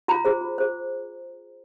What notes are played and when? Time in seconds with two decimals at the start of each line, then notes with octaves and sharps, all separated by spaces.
0.08 F4 A#5
0.25 G#4 C5
0.41 F4
0.58 G#4 C5